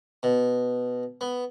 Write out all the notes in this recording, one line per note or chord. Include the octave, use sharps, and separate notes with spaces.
B2
B3